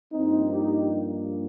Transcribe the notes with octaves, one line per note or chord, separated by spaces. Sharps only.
G2 F3 A#3 C4 D#4
D#4 G4